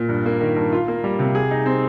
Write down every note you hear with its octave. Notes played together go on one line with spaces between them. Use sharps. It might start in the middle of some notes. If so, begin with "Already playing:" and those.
Already playing: A#2
G2
A#3
D#3
G2
F4
A#3
G3
C3
G#4
D#4
C4